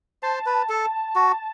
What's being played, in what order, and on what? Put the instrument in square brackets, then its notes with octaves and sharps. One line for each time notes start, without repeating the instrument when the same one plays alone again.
[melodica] C5 [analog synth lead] A5
[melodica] B4
A4
F#4